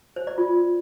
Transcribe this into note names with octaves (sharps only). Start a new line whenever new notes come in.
C5
D5
F4